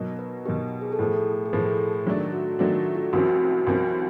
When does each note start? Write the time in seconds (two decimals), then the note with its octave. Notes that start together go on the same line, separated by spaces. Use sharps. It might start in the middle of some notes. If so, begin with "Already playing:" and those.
Already playing: B2 F#3 A#3 D#4
0.19 B4
0.46 B2 F#3 A#3 D#4 G4
0.63 G4
0.81 G#4
0.92 A4
0.99 A2 F3 A#3 G#4
1.14 A4
1.24 G#4
1.35 A4
1.46 G#4
1.53 A2 F3 A#3 A4
1.68 G#4
2.05 D#3 F#3 A3 D4 G4
2.32 F#4
2.59 D#3 F#3 A3 D4 F#4
2.78 F4
2.88 F#4
2.95 F4
3.13 C2 C3 F3 A#3 C#4 F#4
3.67 C2 C3 F3 A#3 C#4